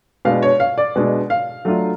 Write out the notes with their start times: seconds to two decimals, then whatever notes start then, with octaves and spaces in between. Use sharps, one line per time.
0.25 B2 G#3 D4 F5
0.42 C#5
0.60 F5
0.78 D5
0.96 B2 G#3 D4
1.30 F5
1.65 F#3 A3 D4 F4